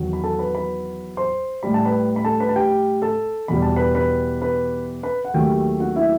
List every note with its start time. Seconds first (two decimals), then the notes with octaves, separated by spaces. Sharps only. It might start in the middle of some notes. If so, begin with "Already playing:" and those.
Already playing: E2 D#3 F#3
0.13 B5
0.24 A4 A5
0.39 B4 B5
0.55 B4 B5
1.17 C5 C6
1.63 A2 G3 B5
1.74 A5
1.85 B4 B5
2.16 B5
2.25 A4 A5
2.40 B4 B5
2.49 A5
2.56 G4 G5
3.02 A4 A5
3.48 E2 B2 G3 B5
3.62 A5
3.76 B4 B5
3.95 B4 B5
4.42 B4 B5
5.03 B4 B5
5.25 F#5
5.34 D#2 D#3 F#3 A3 G4 G5
5.80 F#4 F#5
5.96 E4 E5